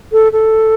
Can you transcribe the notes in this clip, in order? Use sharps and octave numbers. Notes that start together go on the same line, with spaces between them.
A4
A4